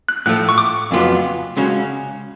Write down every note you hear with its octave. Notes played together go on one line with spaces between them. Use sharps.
F#6
A2 F3 A3 F#6
C#6
D6
F2 C#3 F#3 B3 F4
C#3 G#3 C#4 F#4